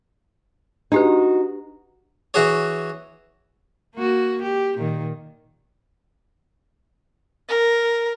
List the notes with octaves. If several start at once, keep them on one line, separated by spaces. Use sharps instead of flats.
D4 D#4 F#4 G4 B4
E3 F#4 G#4 C#5
A#3 F#4
G4
A#2 D#3
A#4